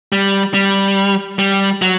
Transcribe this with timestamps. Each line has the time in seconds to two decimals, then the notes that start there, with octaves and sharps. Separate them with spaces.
0.12 G3
0.54 G3
1.39 G3
1.82 F#3